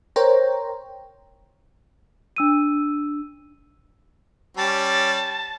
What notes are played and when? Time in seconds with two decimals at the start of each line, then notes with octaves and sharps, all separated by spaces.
0.16 A#4 C5 C#5 G5 A#5
2.36 D4 E6 D#7
4.57 G3 C#4 G4 A5